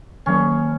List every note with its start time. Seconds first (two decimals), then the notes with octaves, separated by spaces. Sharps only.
0.26 D#3 F#3 A#3 C#4